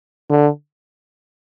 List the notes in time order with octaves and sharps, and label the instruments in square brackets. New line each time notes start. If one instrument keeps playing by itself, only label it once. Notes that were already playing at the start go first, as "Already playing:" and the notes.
[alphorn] D3